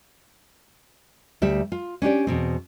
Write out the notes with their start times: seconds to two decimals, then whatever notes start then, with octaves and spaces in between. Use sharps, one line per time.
1.42 D2 G3 E5
1.72 F4
2.02 C#4 D4 G4 D5
2.27 E2 B2 C4